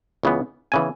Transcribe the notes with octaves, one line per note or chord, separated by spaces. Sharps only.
C#2 C#3 E3 B3
C#3 E3 B3 G#5